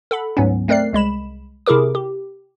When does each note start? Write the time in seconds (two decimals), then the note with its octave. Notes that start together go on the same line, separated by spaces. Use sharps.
0.11 A4 F#5 B5
0.37 D2 G#2 F#3 B3 C#4
0.68 A3 C4 A#4 D5 F#6 C7
0.93 C2 G#3 B5 E7
1.66 C3 E4 G#4 A#4 D6
1.95 G4